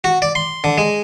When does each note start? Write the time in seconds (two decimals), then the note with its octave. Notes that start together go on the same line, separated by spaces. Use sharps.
0.04 F#4
0.22 D5
0.35 C6
0.64 D3
0.78 G#3